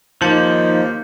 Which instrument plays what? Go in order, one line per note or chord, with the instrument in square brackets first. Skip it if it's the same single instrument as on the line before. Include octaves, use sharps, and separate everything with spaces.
[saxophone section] D#2 D#3 A#3 [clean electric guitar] F3 [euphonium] D#4 [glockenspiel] A5 G6 C#7